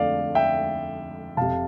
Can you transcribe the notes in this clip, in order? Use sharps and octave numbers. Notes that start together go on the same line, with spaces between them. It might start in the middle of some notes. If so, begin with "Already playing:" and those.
Already playing: F2 D3 F3 A3 D5 F5
E5 G5
F1 F2 C3 F5 A5